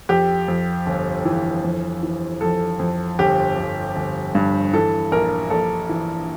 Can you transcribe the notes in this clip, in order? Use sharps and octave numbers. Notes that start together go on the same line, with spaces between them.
F2 G4
F2
G1
E3
F2
E3
F2 A4
F2
G1 G4
G1
G1
G2
E3 A4
A#1 A#4
A#1 A4
E3